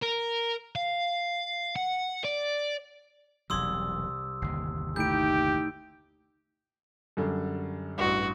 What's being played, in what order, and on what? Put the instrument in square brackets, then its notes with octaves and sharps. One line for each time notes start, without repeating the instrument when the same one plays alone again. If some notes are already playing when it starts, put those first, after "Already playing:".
[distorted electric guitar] A#4
F5
F#5
D5
[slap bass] E1 C3 F#3 [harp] C2 G#6 [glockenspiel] C6 D#6 E6
[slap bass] G1 D#2 [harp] C7
[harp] A3 D#4 E4 [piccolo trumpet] G4 [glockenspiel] G6 D7
[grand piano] F#2 D3 G3
[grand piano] A1 G2 [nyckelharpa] F#4